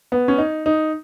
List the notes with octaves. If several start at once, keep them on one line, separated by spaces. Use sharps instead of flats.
B3
C#4
D#4
D#4